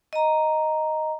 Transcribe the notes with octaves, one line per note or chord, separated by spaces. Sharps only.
D#5 A#5